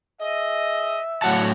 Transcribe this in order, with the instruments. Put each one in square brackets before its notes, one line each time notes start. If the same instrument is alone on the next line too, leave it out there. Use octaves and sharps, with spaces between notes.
[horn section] G#4 D#5 [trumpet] E5
[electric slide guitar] A2 F#3 A5 [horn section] F#5